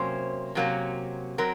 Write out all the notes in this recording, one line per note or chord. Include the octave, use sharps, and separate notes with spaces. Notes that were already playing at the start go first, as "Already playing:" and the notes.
Already playing: C3 F#3 A#3 C#4 C5
C3 F#3 A#3 C#4
F#3 C4 A#4